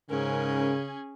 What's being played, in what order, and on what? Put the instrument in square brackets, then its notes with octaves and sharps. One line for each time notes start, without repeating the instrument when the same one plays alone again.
[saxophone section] G#2 A#4 [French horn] C#3 [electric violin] C#4 G#4